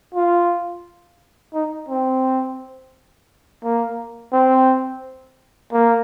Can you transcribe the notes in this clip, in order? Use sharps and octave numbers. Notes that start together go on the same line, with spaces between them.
F4
D#4
C4
A#3
C4
A#3